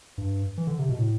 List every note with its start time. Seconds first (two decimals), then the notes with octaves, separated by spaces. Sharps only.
0.18 G2
0.58 E3
0.67 D3
0.79 C3
0.89 B2
0.99 A2